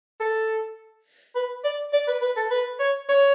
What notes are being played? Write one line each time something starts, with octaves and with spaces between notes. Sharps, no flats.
A4
B4
D5
D5
B4
B4
A4
B4
C#5
C#5